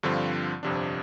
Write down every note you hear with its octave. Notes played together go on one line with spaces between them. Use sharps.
G2 D3 F3 C4 F4
G1 F2 C3 F3 D4